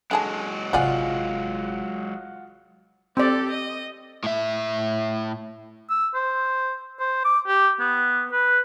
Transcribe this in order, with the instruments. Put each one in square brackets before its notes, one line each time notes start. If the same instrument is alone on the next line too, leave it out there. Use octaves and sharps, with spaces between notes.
[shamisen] D3 G#4 A5 [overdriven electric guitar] F#3 G#3
[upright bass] G#1 C3 [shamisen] F3 D5 G#5 [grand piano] F4 F#5 F#6
[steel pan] C4 D5 [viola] G4 A4
[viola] D#5
[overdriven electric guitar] A2 E5
[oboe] E6
C5
C5
D6
G4
B3
B4